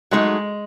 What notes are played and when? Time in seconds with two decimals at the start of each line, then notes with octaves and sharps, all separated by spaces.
0.11 F#3 G#3 A3 D#4 G#4